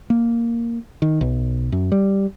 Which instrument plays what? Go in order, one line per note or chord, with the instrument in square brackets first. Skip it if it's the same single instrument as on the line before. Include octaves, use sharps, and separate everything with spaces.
[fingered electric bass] A#3
D#3
B1
F#2
G3